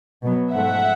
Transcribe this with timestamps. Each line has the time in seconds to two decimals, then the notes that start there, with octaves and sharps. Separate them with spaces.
0.23 B2 F#3 B3
0.53 G#2 F3 A3 E5 F#5